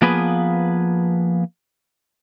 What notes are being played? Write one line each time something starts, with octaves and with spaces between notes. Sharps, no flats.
F3 A#3 B3 G#4 B4